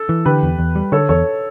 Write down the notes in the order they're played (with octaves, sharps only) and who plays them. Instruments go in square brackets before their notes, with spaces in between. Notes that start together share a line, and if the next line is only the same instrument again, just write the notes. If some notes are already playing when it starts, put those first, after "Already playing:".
Already playing: [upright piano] A4
[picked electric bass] E3
[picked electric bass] D3 [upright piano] G4 B4
[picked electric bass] E2
E2
G3
[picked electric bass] D3 [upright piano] A4 C#5
[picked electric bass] E2 [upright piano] A4 C#5